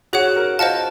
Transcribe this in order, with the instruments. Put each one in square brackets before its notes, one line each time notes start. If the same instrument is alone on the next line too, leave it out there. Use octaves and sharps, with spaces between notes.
[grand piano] F#4 [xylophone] G#4 C#5 F#5
[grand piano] A#4
[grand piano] F4 [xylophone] C5 D#5 F#5 A5